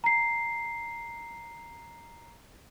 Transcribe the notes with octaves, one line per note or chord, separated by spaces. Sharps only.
A#5 C7